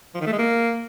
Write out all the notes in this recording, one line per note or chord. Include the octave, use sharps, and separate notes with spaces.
F3
D#3
A3
G#3
A#3